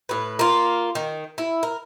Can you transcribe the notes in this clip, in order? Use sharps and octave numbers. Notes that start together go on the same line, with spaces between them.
A2 B4
A#3 F4
D#3
E4
A#4